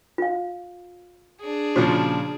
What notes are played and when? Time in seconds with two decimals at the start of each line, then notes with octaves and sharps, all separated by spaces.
0.18 F4 F5
1.41 D4 G#4
1.76 A#2 C#3 F3 F#4 C5